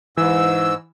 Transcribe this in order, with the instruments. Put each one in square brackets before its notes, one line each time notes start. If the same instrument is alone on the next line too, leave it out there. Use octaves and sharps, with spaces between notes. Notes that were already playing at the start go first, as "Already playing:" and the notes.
[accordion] G#2 E6 [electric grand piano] E3